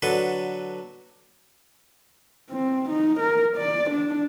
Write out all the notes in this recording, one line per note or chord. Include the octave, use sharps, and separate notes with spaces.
D3 F#3 A4 B4
C4
D#4
A#4
D5
D4